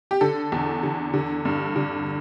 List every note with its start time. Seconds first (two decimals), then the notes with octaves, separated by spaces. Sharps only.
0.11 G4
0.21 D3 A4
0.52 E2
0.83 D3
1.14 D3
1.45 G2
1.76 D3